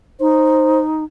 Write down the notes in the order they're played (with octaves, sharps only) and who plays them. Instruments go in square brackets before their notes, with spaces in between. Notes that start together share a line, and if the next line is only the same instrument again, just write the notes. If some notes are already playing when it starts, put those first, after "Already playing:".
[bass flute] D#4 [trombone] C5